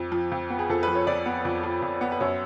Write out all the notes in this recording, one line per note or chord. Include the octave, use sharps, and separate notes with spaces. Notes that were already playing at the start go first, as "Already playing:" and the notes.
Already playing: F2
F3
F2
B3
G#4
F2 A4
F3 B4
C#5
F2 D5
B3
F2
F3
F2
B3
B4
F#2 C#5